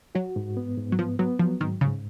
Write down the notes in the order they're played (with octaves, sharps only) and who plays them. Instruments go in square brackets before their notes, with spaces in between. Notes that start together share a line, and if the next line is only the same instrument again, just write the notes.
[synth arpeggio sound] F#3 [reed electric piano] F#4
[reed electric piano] G#2
B3
G#2
[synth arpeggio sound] F#3
[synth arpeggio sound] F3 [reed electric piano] B3
[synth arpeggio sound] F#3 [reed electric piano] B3
[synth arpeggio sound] F3 [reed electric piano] F#3
[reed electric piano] G#2 [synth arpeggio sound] D#3
[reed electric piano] G#2 [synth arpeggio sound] C#3